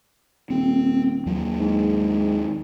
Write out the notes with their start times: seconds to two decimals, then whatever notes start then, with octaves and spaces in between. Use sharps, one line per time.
0.50 D#1 C4
1.26 D#2 F#3 A#3
1.60 G#2